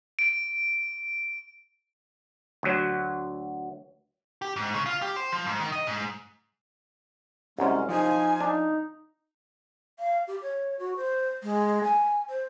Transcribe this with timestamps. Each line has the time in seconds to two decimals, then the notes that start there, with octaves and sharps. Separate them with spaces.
0.19 D7
2.63 D2 F#3
4.42 G4
4.56 G#2
4.74 C#3
4.86 F4
5.02 G4
5.16 C5
5.32 F3
5.46 G#2
5.60 D#3
5.72 D#5
5.87 G#2
7.59 C2 F#2 G#3 C#4
7.89 F3 D#4 G#5
8.40 D4 D#4
9.99 F5
10.28 G4
10.42 C#5
10.79 F#4
10.97 C5
11.43 G#3
11.84 G#5
12.29 C5